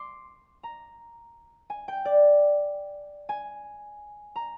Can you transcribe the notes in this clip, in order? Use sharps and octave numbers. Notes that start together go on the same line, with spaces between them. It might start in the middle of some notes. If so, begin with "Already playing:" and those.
Already playing: C6 D6
A#5
G#5
G5
D5
G#5
A#5